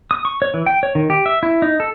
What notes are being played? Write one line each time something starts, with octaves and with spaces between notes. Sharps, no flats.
D#6
C#6
C#5
E3
G5
C#5
D#3
G4
E5
E4
D#4
A4